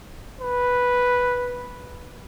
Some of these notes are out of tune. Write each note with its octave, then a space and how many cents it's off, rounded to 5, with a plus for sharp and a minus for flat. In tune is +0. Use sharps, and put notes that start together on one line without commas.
B4 -5